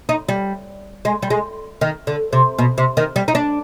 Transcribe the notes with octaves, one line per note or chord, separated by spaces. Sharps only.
D#4
G3
G#3
G3
G#3
D#3
D3
C3
B2
C3
D#3
G3
D#4
D4